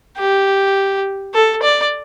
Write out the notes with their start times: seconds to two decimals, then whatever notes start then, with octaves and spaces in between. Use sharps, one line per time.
0.18 G4
1.34 A4
1.63 D5